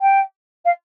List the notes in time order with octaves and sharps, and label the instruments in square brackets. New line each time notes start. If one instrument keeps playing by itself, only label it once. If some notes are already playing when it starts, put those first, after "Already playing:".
[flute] G5
F5